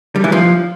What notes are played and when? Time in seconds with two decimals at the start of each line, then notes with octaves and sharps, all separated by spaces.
0.16 G3
0.24 E3
0.32 F3